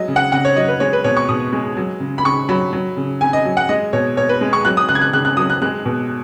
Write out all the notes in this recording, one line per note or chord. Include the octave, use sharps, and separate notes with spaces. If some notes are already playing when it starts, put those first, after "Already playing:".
Already playing: F#3 G#3 D#5
C#3
F#5
C#3 F#5
C#5
F#3 D#5
B4
G#3 C#5
B4
B2 C#5
C#6
B2 D#6
G#3
F#3
C#3
B5
C#3 C#6
F#3 B5
F#3
C#3
C#3 G#5
D#5
F#3
F#5
G#3 D#5
B2 C#5
B2 C#5
B4
G#3
C#6
F#3 F#6
D#6
C#3 F#6
G#6
F#6
C#3 F#6
F#6
F#3 D#6
F#6
G#3 F#6
B2